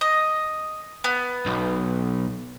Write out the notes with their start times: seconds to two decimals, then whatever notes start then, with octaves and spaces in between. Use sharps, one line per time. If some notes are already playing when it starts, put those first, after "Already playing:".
0.01 D#5
1.04 B3
1.46 B1